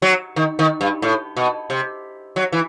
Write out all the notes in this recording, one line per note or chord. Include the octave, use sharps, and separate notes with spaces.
F#3
D#3
D#3
G2
A2
B2
C3
F#3
E3